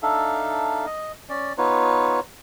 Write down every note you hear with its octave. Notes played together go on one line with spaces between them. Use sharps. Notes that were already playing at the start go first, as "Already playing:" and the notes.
D4 D#4 A4 E5 F5
D#5
C#4 D5
B3 D#4 F4 B4 C#5